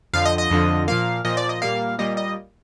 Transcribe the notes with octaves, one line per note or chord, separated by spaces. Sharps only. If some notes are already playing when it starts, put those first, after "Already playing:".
F2 D3 F3 F5
D#5
D#5
F2 D3 F3
A#2 F3 A#3 F5
A#2 F3 A#3 D#5
D5
D#5
A#2 G3 A#3 F5
A#2 G3 A#3 D#5
D#5